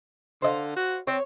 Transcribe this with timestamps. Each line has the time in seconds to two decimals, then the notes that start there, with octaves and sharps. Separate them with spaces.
0.42 D3 C5 D#5 F5
0.76 F#4
1.07 C4 C#5